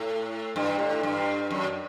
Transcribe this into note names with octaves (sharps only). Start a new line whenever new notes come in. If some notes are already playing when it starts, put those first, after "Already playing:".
Already playing: A2
G2
A2
G2
F#2